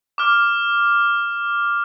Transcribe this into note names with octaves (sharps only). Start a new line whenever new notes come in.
D6 F6